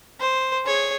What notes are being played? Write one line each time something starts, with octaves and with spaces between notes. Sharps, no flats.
C5
G#4 C#5